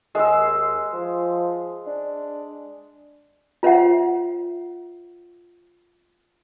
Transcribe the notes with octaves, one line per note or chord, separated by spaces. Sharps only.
D#2 G#3 E6
F3
D4
F4 C5 E5 F#5